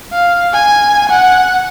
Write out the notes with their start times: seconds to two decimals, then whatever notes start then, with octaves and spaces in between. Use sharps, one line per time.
0.13 F5
0.53 G#5
1.10 F#5